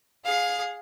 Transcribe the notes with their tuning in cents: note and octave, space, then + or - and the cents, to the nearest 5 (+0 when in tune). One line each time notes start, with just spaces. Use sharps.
G#4 +0 F5 +25